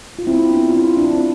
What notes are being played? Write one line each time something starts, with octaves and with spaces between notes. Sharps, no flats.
F4
C4 E4
B3 D4
F4
C4 E4
D4 F4
C4